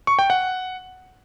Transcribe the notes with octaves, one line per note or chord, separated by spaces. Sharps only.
C#6
G5
F#5